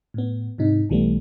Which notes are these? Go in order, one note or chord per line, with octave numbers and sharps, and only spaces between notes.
A2 B3
G#2 C3 D#4
B1 E3 G3 A3 B3